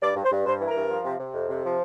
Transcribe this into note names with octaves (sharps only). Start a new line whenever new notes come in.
G2 D5
G2
C5
G2
G2 C5
E3
A#4
G2
F3
C3
C3
F2
C3
F3